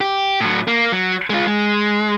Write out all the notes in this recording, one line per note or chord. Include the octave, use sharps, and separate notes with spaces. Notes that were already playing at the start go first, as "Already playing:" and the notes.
G4
A2 F#3
A#3
F#3
G#3 F4
G#3